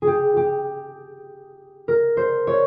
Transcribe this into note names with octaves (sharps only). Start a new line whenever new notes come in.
G#4
G4
G4
A#4
C5
C#5